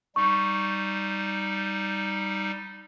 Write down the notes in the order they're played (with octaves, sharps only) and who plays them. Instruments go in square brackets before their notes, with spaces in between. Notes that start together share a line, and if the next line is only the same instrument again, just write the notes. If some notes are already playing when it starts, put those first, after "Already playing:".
[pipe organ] G3 D#4 [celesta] C#6